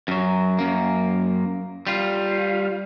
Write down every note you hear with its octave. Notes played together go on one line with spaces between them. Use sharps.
F#2 F#3
F#2 A#3
G3 F4